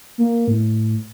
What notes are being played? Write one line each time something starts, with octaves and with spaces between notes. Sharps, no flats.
A#3
A2